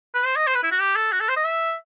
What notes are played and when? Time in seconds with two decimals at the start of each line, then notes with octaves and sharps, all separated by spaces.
0.14 B4
0.25 C5
0.36 D#5
0.47 C5
0.55 B4
0.64 E4
0.71 F#4
0.79 G4
0.96 A4
1.12 F#4
1.20 A4
1.29 C5
1.36 D#5
1.44 E5